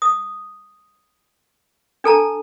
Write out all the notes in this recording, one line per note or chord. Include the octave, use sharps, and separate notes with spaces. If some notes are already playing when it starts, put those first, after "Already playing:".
D#6
D4 A4 A5 A#5